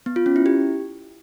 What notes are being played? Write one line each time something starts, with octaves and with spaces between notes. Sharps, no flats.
B3
F4
C#4
E4
G4